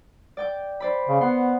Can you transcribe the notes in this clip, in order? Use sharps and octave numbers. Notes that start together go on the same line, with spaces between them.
D5 G5 D6
C5 D5 B5
C#3
B3 F#5 C6